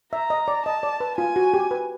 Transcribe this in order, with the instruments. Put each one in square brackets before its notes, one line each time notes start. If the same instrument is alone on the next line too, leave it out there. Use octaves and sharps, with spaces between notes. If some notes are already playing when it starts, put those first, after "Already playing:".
[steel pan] E5 [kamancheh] A#5
[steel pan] D#5
D5
[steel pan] D#5 [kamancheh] A5
[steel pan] D5
B4
[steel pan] F4 [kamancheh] G#5
[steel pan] F#4
G4
B4